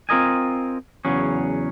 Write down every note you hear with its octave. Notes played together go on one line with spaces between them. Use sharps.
C4 F4 A#4 D#5 G#5
E2 C#3 F#3 C#4